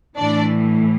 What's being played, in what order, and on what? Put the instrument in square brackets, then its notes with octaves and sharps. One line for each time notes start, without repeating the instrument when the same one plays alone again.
[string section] A2 E3 D4 D5